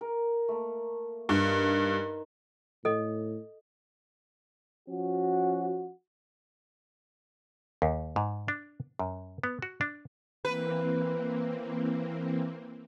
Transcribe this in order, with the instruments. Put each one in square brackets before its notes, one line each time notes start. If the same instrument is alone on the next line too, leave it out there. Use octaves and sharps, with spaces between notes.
[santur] A#4
A3 A#3
[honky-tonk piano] G2 [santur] D#4 F4 A#4
[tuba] A2 [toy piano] A4 D#5
[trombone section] F3 C#4 F#4
[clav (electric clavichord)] D#2
G#2
D4
F#2
B3
F#4
D4
[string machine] E3 A#3 C4 [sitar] B4